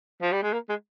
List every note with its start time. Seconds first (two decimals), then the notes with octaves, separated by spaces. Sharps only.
0.22 F3
0.32 G3
0.42 G#3
0.53 A#3
0.69 G#3